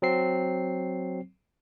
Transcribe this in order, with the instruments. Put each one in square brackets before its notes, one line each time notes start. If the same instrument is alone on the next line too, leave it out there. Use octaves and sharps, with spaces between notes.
[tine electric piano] F#3 C4 C7